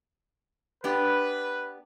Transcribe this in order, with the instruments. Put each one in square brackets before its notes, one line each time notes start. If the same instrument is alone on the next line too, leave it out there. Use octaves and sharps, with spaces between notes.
[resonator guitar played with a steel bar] B3 D4 G4 [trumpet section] B4